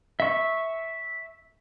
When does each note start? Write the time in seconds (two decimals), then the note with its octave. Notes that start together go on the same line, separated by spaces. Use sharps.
0.20 E5 C#6